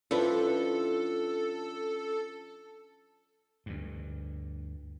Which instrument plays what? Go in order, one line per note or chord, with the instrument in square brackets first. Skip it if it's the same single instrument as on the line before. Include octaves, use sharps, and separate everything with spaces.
[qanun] F3 D4 [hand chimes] C#4 [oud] E4 B4 [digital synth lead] A4
[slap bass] D2 G2